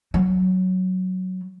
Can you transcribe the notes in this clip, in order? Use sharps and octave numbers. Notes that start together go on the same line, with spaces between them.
F#3